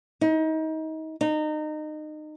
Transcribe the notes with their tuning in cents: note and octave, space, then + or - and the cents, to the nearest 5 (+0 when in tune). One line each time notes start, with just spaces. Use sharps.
D#4 +30
D#4 -25